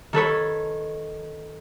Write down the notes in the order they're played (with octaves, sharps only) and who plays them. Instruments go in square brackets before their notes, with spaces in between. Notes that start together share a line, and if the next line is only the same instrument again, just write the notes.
[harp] D#3 A4 B4 C#5